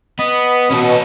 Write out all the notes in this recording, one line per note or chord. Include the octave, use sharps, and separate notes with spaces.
B3 D#5 B5
B2 C#4 A4